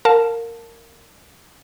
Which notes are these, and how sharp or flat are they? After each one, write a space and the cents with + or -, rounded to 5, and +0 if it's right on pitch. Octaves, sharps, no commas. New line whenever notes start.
A#4 -15 F5 +25 A5 +0